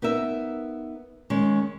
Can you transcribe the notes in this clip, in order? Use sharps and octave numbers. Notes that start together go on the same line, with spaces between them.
B3 D#4 A#4 E5
D#3 G#3 C#4